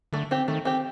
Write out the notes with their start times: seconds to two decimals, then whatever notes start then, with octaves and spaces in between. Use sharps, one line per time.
0.13 D3 A3
0.31 C4 G4
0.48 D#3 A3
0.65 C4 G4